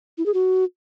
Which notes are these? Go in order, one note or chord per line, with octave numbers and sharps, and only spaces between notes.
E4
G#4
F#4